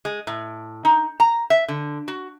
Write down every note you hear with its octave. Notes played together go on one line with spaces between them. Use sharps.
G#3
A2
D#4
A#5
E5
D3
F#4